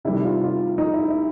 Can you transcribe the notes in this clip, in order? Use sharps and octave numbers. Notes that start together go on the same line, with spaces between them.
C3 D#3 G3 E4
F4
F4
D#4
E4
E4